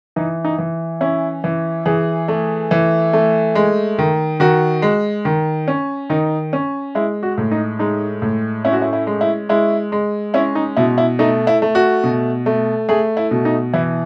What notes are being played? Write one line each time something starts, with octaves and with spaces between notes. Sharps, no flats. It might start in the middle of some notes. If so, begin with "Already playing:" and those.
E3 D#4
D#4
E3
C#4 E4
E3
E3 G#4
A3
E3
A3
G#3
D#3
D#3 F#4
G#3
D#3
C#4
D#3 D#4
C#4
G#3 E4
F#4
A2
D#4
G#3 D#4
A2
C#4 E4
F#4
E4
E4
G#3
E4
G#3 E4
G#3
C#4 E4
D#4
B2 E4
E4
A3 D#4
E4
A3
F#4
B2
A3
A3 G#4
E4
B2
D#4
E3 E4